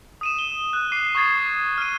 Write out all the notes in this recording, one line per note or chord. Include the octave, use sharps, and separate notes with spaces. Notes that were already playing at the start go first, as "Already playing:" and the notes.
D#6 D#7 E7
G7
F#6
D6 D#6 C7 D#7
C#6 D#6 G#6 A6 C7
F6 D#7